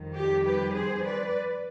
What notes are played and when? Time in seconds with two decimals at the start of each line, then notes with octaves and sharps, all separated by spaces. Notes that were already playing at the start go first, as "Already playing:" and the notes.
Already playing: F2 D#3 G3
0.16 G4
0.45 G4 B4
0.74 G#4 C5
1.03 B4 D5